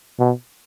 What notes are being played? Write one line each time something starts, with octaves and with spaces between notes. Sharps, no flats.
B2